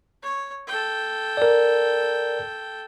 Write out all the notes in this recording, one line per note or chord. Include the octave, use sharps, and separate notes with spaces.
C#5
A4 G5
A#4 D5